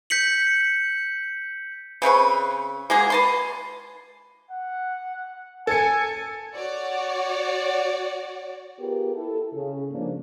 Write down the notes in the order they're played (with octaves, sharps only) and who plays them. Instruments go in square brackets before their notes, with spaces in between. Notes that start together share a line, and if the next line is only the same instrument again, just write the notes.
[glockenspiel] G6 B6 C#7 F#7
[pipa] C#3 C4 B4 C#6
G#3 A#3 F#4 G#4
B4 A5 C6
[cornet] F#5
[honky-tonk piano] A4 C#7 [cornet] G#5
[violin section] F#4 C#5 D5
[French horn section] B3 F4 G4 G#4 A#4 B4
E4 A4
C#3
G#2 F3 A#3 C#4 D4